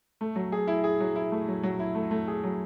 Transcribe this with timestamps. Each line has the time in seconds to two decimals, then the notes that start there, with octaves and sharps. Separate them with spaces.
0.21 A3
0.36 F#3
0.52 G#4
0.68 E4
0.84 G#4
1.00 F#3
1.16 E4
1.32 A3
1.48 F#3
1.63 F#3
1.79 E4
1.95 A3
2.11 A3
2.28 G#4
2.43 F#3